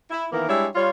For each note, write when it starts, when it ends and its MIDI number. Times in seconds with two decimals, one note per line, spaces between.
0.10 0.25 64
0.32 0.46 51
0.32 0.46 52
0.32 0.46 58
0.32 0.46 59
0.32 0.46 64
0.32 0.46 70
0.48 0.67 55
0.48 0.67 56
0.48 0.67 62
0.48 0.67 64
0.48 0.67 73
0.48 0.67 76
0.75 0.90 55
0.75 0.90 65
0.75 0.90 73